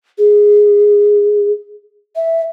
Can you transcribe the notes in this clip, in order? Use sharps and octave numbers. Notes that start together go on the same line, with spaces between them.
G#4
E5